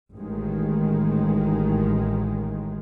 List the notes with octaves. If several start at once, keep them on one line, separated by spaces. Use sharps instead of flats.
A1 D#3 G#3